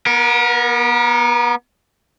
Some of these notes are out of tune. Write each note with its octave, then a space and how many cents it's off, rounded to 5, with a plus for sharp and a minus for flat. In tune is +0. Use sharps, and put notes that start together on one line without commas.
B3 -30 A#4 +20